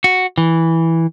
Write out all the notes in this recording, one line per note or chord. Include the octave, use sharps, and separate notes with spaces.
F#4
E3